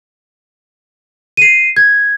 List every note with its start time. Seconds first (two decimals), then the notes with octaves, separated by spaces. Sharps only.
1.37 C7 D#7
1.76 G#6